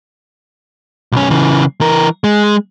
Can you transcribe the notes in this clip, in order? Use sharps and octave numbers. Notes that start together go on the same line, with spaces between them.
B1 C#4
C#3 E3
E3 A#4
G#3